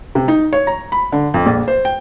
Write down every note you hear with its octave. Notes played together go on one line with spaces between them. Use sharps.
C3
D#4
C#5
A#5
B5
D3
F2
A#1
C5
G5